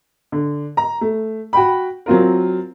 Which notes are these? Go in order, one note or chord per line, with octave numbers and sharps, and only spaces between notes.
D3
A#5
A3
F#4 G5 B5
F#3 C4 F4 A#4